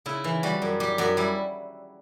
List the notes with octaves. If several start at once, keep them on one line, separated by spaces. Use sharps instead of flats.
C#3 E4
E3
G3 F#4
F#2
G3 G4
F#2 F#4
G3 E4